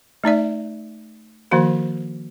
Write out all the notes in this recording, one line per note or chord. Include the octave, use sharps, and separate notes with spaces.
A3 D#4 D5 E5
D#3 F3 A#3 F#4 C5